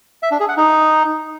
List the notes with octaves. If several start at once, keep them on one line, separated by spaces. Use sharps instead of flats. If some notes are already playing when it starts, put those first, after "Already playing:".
E5
D4
G#4
F#5
D#4